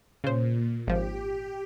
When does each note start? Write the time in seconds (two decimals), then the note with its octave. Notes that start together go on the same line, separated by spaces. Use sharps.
0.24 A#2 C#3 C5
0.87 G#1 F3 G4